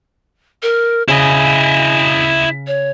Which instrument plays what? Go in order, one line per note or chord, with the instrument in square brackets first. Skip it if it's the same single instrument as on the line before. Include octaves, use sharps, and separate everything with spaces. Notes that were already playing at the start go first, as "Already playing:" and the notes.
[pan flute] A#4
[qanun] C#3 [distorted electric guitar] E4 D#5 [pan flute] G#5
[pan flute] C#5